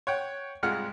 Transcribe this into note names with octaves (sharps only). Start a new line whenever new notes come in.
C#5 F#5 G5
C2 G#2 G#3 F4 F#5 F6